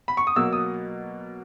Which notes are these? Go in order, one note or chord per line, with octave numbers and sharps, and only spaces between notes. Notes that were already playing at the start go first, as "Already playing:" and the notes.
B5
C#6
D#6
B2 F#3 A#3 E6
D#6